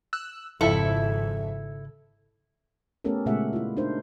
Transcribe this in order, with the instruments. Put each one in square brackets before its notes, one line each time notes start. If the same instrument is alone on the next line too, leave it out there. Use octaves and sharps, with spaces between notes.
[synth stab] E6 F#6
[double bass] G#1 [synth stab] F2 E5 [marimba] C#3 [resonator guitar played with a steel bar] E4 A4
[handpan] A3 B3 C#4 G4 A4 A#4
A#2 C#3 G#3 A3 E5 F#5
E4 F4
D4 D#4 A#4 C5